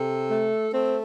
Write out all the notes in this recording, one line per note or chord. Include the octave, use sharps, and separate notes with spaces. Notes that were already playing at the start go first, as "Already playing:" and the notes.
Already playing: C3 A4
A3
A3 C4